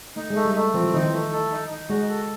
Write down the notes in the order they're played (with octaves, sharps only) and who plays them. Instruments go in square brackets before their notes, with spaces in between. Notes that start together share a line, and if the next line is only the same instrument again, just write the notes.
[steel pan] A3 [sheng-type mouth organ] D#4
[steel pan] G#3
[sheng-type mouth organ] A3
[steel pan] G3
[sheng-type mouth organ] A3
[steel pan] F3 [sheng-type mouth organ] C4
[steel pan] E3
[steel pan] D#3 [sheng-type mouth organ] D#4
[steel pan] E3
[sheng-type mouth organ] A3
A4
D#4
D#4
[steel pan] G#3 [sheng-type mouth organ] F#4
[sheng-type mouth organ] A4